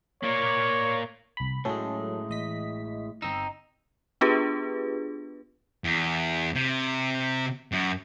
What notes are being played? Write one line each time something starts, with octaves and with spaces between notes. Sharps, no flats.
A#3 C#5 D5
C2 B5
A2 F#3 G#3 C#4 A4
A1 D#5 B6
G1 C4 D#4 E6
B3 D4 F4 G4 G#4 B4
E2
C3
F#2